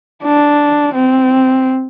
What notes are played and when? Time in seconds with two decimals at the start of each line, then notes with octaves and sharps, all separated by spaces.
0.23 D4
0.94 C4